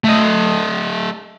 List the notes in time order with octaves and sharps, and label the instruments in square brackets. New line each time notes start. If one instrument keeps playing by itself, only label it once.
[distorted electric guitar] A3 D#5